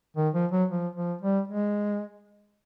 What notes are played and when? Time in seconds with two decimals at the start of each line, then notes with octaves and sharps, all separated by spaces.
0.17 D#3
0.34 F3
0.52 F#3
0.69 F3
0.95 F3
1.21 G3
1.48 G#3